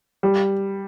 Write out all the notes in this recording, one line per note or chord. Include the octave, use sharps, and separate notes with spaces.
G3